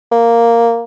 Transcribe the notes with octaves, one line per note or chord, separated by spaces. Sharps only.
A#3